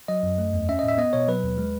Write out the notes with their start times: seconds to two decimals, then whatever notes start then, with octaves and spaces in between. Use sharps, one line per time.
0.08 F#3 D#5
0.23 F#2
0.38 A3
0.53 E2
0.69 C#4 E5
0.79 A2 D#5
0.88 E5
0.98 B3 D#5
1.13 B2 C#5
1.28 F#3 B4
1.44 D#2
1.58 G#3